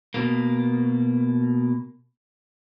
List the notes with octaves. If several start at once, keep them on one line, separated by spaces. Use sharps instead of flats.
B2 A#3